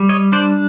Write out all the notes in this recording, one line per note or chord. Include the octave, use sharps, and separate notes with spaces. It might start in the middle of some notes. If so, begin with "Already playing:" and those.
Already playing: G3
C#5 D#5
D4 C5 D5